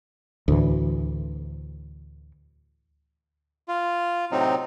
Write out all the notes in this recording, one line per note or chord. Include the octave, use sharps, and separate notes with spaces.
D2 A2 E3
F4
A2 C3 F#3 C4 D#4